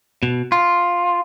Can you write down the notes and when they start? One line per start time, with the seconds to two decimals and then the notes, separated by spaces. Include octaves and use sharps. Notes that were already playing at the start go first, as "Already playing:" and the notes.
0.23 B2
0.52 F4